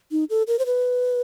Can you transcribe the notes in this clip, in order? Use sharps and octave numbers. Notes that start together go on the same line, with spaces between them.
D#4
A4
A#4
C5
B4